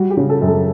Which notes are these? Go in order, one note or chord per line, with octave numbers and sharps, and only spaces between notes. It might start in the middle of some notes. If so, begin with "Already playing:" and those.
Already playing: G3 F#4
G4
C#3
A4
F#2
A4